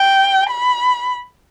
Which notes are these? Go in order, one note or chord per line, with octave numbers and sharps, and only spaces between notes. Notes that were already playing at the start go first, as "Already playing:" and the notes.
Already playing: G5
B5